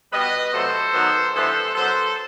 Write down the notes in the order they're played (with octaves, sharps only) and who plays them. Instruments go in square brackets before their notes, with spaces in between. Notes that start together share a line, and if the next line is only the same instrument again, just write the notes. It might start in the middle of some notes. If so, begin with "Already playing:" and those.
[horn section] B2 G3 B3 B4 D#5
C3 F#3 A3 A4 C5
D#3 F#3 B3
G2 E3 B3 A4 C5
F#2 F#3 B3 A4 C5